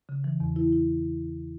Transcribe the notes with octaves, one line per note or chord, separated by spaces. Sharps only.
C#3
E3
E2
E4
E4